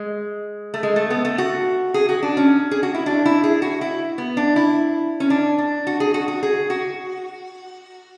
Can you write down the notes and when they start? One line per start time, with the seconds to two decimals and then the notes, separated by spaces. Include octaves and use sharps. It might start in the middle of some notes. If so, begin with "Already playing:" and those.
Already playing: G#3
0.74 A3
0.83 G#3
0.96 A3
1.10 B3
1.25 A3
1.38 F#4
1.94 G#4
2.09 F#4
2.23 D4
2.37 C#4
2.71 G#4
2.83 F#4
2.94 E4
3.06 D4
3.26 E4
3.44 G#4
3.62 F#4
3.81 E4
4.18 B3
4.37 D4
4.56 E4
5.20 C#4
5.30 D4
5.58 D4
5.87 F#4
6.00 G#4
6.14 F#4
6.28 F#4
6.43 G#4
6.70 F#4